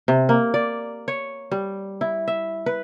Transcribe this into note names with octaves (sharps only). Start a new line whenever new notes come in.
C3
A#3
D5
C#5
G3
E4
E5
B4